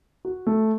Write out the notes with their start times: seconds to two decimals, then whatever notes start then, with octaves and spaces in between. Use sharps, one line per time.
0.25 F#4
0.47 A3